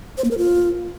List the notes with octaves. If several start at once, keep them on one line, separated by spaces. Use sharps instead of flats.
C5
A#3
A#4
F4